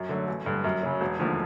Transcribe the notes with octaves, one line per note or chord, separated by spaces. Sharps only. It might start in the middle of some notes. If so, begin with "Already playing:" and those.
Already playing: F#2
D3 F#3 A3
A1
G2 D3
F#2
C#3 F#3
E1
D#2 D3 F3 A3